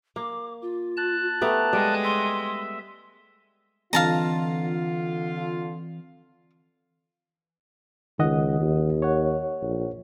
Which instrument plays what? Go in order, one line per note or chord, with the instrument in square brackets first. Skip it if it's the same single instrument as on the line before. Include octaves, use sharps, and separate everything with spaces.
[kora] A#3 [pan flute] D6
[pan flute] F4
[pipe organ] A5 F#6
[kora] A3 B3 G4 [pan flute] A#5
[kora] G3 [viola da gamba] G#3
[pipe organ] E5 [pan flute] C6
[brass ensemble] D3 F4 [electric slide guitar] E3 C4 D#5 [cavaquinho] F5 A5 A#5
[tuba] C#2 [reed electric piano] D#3 D#5 F#5
[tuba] D#2
[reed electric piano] C#5 F#5
[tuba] A#1